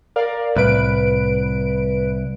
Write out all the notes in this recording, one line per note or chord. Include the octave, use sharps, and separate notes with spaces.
A#4 D5 F5
C2 A2 B4 D7